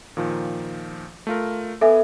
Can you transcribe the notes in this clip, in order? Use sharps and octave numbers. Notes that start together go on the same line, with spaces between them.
A#2 D#3 F3
A3 F4 A#4
B3 A4 E5 G#5 D6